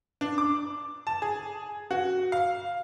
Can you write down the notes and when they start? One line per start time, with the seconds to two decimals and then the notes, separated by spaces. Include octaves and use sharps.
0.21 D4
0.38 D6
1.07 A5
1.22 G#4
1.91 F#4
2.32 F5